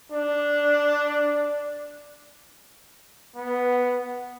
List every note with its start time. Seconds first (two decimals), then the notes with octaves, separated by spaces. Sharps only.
0.12 D4
3.36 B3